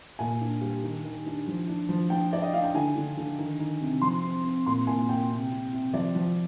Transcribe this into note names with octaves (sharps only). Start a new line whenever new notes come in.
A#2 G#5
D4
G3
D#3
D#3
D4
F3
D4
F3
D4 G5
D4 D5
D#5
D4 F5
G5
D3 G#5
D3
D3
D#3
D#3
C3
F3 C6
C4
C4
A#2 C6
A#2 G#5
A#2 G5
C3
C3
C3
F3 D5
F3